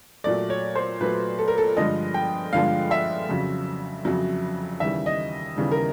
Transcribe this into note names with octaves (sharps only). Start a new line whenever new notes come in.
A#2 F#3 A3 D5
C#5
C5
A#2 F#3 A3 B4
A4
A#4
A4
G2 D3 F3 G#3 D#5
G5
G2 D3 F3 G#3 F5
E5
F2 C#3 F#3
F2 C#3 F#3
D#2 C#3 E3 G3 E5
D#5
D#2 C#3 E3 G3
A#4